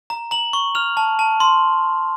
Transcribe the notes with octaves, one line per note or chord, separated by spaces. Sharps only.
A#5
A#5 F#7
C#6
F6 F7
A5
A5
C6